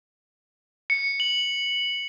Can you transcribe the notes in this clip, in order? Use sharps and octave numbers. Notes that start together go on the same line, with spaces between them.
C#7
F#7